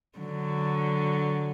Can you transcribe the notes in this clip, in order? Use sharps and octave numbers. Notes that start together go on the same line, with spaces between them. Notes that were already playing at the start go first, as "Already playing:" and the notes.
D3 F#3